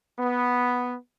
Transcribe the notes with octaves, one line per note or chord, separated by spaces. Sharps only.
B3